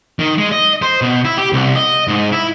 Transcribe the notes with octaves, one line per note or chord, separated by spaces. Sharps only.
D#3
G#3
D#5
C5
B2
E4
G4
C2
D#5
G#2
E4